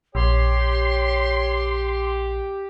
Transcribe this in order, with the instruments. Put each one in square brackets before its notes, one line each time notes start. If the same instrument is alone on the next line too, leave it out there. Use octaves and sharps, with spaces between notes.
[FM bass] A#1 [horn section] G4 [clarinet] C#5 [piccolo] C6